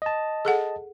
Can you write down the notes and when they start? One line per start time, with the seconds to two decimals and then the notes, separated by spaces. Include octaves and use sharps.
0.02 D#5 A5
0.45 G#4 A4 F#5